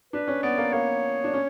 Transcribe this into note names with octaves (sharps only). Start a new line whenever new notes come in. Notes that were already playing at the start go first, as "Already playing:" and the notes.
D4 B4
C#4
B3 D5
A#3
A#3 C#5
D4
C#4